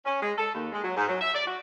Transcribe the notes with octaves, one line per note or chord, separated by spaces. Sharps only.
C#4
G#3
A4
D#2
G#3
F#3
G#2
F#3
E5
D5
F#4